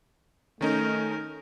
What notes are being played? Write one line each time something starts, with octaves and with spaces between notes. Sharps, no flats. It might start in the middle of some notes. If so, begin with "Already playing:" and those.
D#3 A3 C#4 D#4 A#4